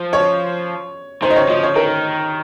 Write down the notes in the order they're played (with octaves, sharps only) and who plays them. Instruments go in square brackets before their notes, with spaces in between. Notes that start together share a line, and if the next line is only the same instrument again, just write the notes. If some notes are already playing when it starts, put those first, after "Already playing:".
Already playing: [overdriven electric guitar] F3
[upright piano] C#5
[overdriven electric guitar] D#3 [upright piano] C5
[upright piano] D#5
C#5
[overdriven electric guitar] F3 [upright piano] D#5
[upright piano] C#5
[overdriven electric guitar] D#3 [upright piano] A#4